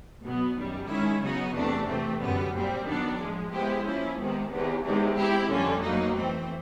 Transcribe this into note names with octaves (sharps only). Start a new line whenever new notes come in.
B2 F#3 B3
F#2 D#3 G3
D#3 G#3 C#4 E4
C#3 F#3 B3 D#4 F#4
E2 C3 E3 A3 D4
C3 E3 A3 C4
F#2 D3 G3 B3
A#2 G3 C4
D#3 F#3 B3 D4
A2 F3 G#3
G#3 B3 E4 G4 C5
F3 A#3 C#4 E4
C3 D#3 G#3 B3
E2 C3 D#3
E2 C3 D#3 G#3
G#3 C4 E4 G4
F2 D3 G3 A#3 C#4
B2 F#3 A#3 D#4
E3 A3 C4